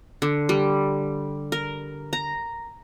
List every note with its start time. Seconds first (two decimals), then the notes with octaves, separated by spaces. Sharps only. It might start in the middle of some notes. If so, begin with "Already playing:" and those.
0.22 D3
0.49 G3
1.52 A#4
2.13 A#5